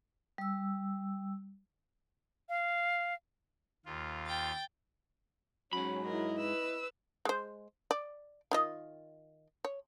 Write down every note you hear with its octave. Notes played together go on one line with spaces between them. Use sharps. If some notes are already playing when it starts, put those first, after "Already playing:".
G3 E6
F5
D#2 F4
G5 A6
G#2 F#3 C#4 B5
E4 A#4 D#5
B4 E6
G#3 C5
D5
D#3 F4 D#5
C#5